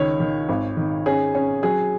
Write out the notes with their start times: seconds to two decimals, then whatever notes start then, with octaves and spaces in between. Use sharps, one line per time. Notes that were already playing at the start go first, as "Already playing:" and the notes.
Already playing: C#2 D#3 C#5
0.20 D#3
0.49 G#1
0.77 D#3
1.06 C#4 G#4
1.35 C#4
1.63 F#3 G#4